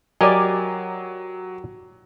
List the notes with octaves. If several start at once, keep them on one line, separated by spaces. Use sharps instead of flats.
F#3 G4 A#4 D5 D#5 G#5